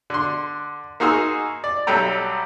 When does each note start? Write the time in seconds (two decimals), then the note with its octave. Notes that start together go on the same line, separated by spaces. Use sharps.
0.10 D3 C6
1.00 A#3 D#4 F#4 G#4 C6 E6
1.64 D5
1.87 B1 F#3 G3 A4 G5 A#5